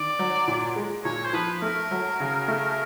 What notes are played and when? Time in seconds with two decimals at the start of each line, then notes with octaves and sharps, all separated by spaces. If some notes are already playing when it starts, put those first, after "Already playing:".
Already playing: D#3 D5
0.19 F#3
0.48 A#2
0.76 G#3
1.05 A#2 C#5
1.25 C5
1.33 F3 B4
1.62 A3 A#4
1.91 F#3
2.20 C#3
2.48 A3